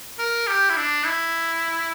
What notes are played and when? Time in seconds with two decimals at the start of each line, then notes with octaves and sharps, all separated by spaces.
0.19 A#4
0.47 G4
0.70 E4
0.77 D4
1.06 E4